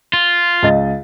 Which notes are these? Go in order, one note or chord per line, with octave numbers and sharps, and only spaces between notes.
F4
C#2 D#5 A6